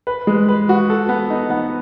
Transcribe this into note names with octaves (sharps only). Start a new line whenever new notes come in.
B4
G#3
B4
F#4
A4
B3
D#4
B3